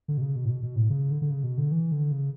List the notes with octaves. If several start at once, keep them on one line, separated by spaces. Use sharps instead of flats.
D3
B2
C#3
B2
A2
B2
B2
A2
C#3
D3
D3
C#3
B2
D3
E3
D3
C#3